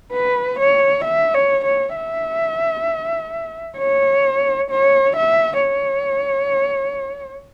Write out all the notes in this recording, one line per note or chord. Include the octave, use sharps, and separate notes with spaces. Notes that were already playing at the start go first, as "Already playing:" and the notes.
B4
C#5
E5
C#5
C#5
E5
C#5
C#5
E5
C#5